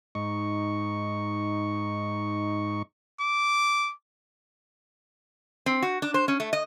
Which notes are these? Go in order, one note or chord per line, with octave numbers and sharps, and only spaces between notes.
G#2 D#4 C#6
D6
C4
F#4
D4
C5
C#4
A3
D#5